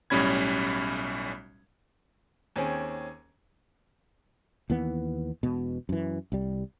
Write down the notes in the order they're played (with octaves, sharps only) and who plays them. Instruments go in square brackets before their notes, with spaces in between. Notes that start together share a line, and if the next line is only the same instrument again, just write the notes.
[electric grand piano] B1 A2 G3 C#4 B5 G#6
[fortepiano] D#2 C4 C#4 G#4
[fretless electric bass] D#2 E3 B3
E1 B2
F#2 E3
C2 G3